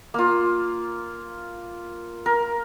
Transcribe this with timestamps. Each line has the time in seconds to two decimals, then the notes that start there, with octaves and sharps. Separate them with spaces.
0.14 A#3 F4
2.26 A#4